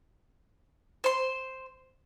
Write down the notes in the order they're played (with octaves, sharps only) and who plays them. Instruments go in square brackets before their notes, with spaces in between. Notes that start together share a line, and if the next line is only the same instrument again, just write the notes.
[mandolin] C5 C6